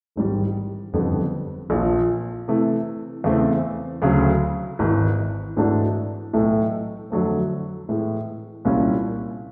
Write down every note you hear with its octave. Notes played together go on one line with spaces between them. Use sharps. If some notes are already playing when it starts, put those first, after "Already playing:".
A1 G#2 D#3 G3
F#1 F2 D3 G3 B3
A#1 A#2 F3
C3 E3 A3
E2 C#3 E3 A3 C4
D2 C#3 F#3 A3
G#1 G#2 E3
G#2 E3 A3 D4 F#4
B1 A2 E3 A3
F2 D3 F#3 A3 C4
A2 E3 G#3
C2 A#2 G3 A#3 C#4